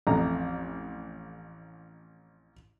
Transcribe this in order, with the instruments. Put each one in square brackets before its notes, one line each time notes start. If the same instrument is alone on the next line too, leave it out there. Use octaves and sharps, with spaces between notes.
[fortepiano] A1 F2 A#5